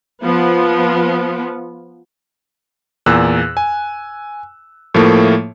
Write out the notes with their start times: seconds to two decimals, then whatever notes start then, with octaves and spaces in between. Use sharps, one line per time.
0.23 F3 B3
3.06 E2 A#2 E6 F#6
3.57 G#5
4.94 A2 F3 A3 A#3